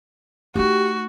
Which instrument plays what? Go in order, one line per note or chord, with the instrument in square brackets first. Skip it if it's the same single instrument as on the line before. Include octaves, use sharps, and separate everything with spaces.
[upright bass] A3 D#4 [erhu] F#4 [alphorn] G4